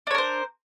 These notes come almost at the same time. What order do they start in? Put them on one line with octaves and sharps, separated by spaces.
D4 C#5 A#4 C5